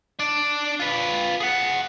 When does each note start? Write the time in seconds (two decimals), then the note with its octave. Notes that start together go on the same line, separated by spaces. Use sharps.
0.19 D4 D5
0.80 F4 B4
1.40 G#4 F#5